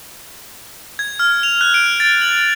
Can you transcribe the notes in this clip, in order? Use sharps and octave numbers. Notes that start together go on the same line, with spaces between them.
G#6
F6
F7
F#6
D7
A6
F#7